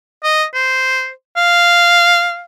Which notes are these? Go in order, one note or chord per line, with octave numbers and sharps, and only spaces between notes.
D#5
C5
F5